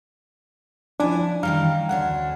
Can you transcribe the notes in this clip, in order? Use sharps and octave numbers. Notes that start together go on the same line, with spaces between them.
F3 C#4 D4 E4 G#5
D#3 E3 G3 F5 A#5 F6
D2 C#4 D4 F#5